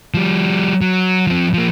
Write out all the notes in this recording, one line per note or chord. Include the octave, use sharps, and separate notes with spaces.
F3 G3
F#3
F3 C4
F3 A#3